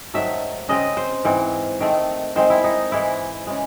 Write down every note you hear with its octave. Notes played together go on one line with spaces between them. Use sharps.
G#2 D#3 F#3 A3 E5
C#3 G#3 C4 D#5
C5
G#2 E3 C4
D#3 A3 C4
D#3 G#3 C4 C5
E4
D#4
G#2 E3 G#3 E4
C#3 E3 G#3